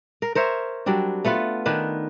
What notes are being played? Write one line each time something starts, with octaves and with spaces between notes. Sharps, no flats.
A#4
A#4 C5 C#5 E5
F#3 G3 C4 D4
A3 B3 F4 B4
D#3 D4 B4